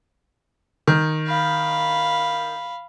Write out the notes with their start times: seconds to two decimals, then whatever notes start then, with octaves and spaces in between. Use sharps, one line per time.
0.87 D#3
1.27 F5 B5